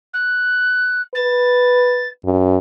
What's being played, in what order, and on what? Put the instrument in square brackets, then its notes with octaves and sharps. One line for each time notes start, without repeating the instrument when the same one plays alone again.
[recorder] F#6
[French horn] B4 [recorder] A6
[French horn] F#2